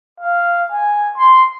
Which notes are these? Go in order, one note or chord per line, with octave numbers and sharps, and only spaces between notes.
F5
G#5
C6